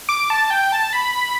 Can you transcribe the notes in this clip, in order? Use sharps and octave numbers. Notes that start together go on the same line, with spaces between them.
D6
A5
G5
A5
B5